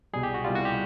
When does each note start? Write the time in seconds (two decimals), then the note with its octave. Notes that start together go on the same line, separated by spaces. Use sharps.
0.13 C2 B2 G3 G#4
0.23 G4
0.34 F#4
0.44 C2 B2 G3 F4
0.55 F#4
0.65 G4